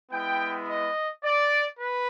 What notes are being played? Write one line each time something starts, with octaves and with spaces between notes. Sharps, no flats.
G#3 B3 E4 G5
D#5
D5
B4